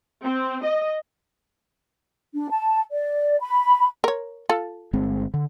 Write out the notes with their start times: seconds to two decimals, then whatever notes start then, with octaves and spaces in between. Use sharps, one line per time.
0.23 C4
0.64 D#5
2.34 D4
2.51 A5
2.91 D5
3.40 B5
4.04 A#4 C#5
4.49 F4 A4
4.93 G1 G#3 C4
5.34 D3